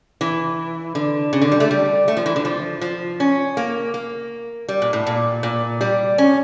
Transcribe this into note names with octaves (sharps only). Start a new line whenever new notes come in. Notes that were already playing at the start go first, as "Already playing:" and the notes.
E3
D3
C#3
D3
G3
A3
G3
A3
F3
E3
D3
F3
F3
C#4
A#3
A#3
G3
A#2
A2
A#2
A#2
G3
C#4